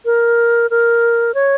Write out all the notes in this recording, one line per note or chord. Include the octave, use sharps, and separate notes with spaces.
A#4
A#4
C#5